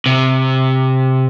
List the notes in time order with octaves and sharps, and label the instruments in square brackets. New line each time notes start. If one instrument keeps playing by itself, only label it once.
[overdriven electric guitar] C3